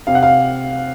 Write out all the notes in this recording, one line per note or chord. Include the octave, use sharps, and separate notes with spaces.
C3 F5
F#5
F5